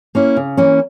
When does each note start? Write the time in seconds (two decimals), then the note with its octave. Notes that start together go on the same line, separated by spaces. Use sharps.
0.15 A#3 C#4 E4
0.36 C#3
0.57 E3 A#3 C#4